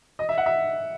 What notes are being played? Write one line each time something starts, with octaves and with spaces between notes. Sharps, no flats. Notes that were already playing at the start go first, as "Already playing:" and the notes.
D#5
E5
F#5
E5